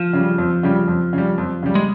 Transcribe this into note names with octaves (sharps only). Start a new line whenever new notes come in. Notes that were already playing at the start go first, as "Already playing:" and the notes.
Already playing: F3
C#3 G3
F2
C#3 G3
F2
C#3 G3
F2
C#3 G3
G#3